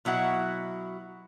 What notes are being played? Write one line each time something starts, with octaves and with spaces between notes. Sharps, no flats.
B2 F#3 E4 F#5